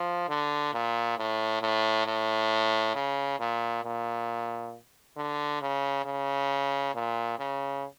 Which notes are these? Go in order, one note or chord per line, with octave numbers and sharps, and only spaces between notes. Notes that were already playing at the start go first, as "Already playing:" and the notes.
Already playing: F3
D3
A#2
A2
A2
A2
C#3
A#2
A#2
D3
C#3
C#3
A#2
C#3